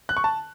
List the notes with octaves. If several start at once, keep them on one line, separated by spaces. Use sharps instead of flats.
F#6
C#6
A5